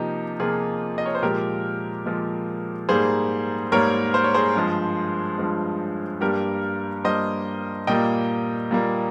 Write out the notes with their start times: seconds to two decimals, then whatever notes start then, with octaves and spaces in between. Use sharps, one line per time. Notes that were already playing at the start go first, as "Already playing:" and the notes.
Already playing: C3 F3 A#3 D#4 G4
0.40 C3 F3 A#3 F4 G#4
0.98 D#5
1.06 C#5
1.15 C5
1.22 A#2 F3 G#3 G4 A#4
2.06 A#2 F3 G#3
2.89 G#2 G3 A#3 G#4 C5
3.72 G#2 G3 A#3 A#4 C#5
4.14 C5
4.24 C#5
4.34 G#4 C5
4.55 G2 F3 G#3
5.38 G2 F3 G#3
6.21 G2 G3 A#3 G4 A#4
7.04 G2 G3 A#3 C5 D#5
7.87 A#2 G3 A#3 D#5 G5
8.71 A#2 G3 A#3